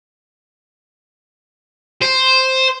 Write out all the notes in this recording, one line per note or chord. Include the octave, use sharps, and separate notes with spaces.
C5